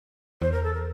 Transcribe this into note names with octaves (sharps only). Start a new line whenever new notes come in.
E2 C5
A#4
A4
A#4